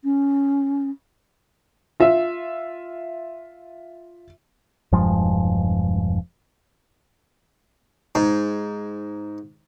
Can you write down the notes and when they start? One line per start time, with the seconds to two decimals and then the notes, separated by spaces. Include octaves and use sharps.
0.04 C#4
2.00 F4 E5
4.92 E1 G2 F3 G#3
8.15 G#2